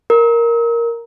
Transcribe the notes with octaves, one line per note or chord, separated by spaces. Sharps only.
A#4